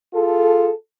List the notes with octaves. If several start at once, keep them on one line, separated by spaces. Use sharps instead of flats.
F4 G#4 A4